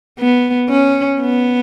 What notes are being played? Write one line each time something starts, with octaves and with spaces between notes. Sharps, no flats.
B3
C#4
B3